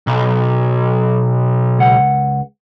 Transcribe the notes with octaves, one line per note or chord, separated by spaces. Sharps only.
B1
C#2 F#5